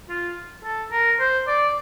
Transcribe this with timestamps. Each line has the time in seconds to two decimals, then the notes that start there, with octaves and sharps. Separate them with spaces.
0.09 F4
0.64 A4
0.92 A#4
1.20 C5
1.47 D5